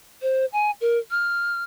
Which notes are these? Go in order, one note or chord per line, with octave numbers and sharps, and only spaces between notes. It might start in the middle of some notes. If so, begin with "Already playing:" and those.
C5
G#5
A#4
F6